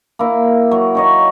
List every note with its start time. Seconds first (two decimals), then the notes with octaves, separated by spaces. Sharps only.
0.19 A#3 E4
0.71 F#3
0.95 D#4 C#5 D#5